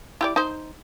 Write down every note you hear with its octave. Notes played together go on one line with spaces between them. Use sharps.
E4 G4 D5
D#4 C5